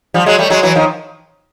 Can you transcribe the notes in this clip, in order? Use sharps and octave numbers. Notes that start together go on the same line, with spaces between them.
F3 G3
F#3 G#3
G3 A3
F#3 G#3
E3 F#3
D#3 F3